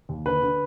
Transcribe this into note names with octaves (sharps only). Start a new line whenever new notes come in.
D#2
D3 B4
D3